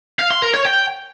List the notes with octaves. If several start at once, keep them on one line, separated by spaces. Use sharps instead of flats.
F5
C6
A#4
C#5
G5